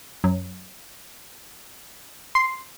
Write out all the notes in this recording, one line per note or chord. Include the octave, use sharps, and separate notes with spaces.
F#2
C6